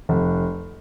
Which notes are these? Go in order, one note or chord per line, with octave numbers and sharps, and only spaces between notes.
F1